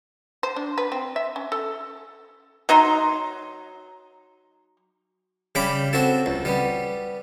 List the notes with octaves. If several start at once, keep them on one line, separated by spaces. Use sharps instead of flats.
C5
D4
B4
C4
E5
C#4
A4
F#3 D#4 C6
C#3 G3 G5 B5 D6
C4 F#4 A4 A5
C#2
G3 B3